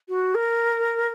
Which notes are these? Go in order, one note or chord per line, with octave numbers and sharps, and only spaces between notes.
F#4
A#4